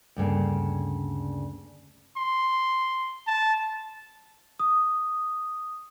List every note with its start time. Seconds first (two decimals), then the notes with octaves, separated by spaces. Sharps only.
0.16 D2 G2 C#3 A#3
2.17 C6
3.27 A5
4.59 D#6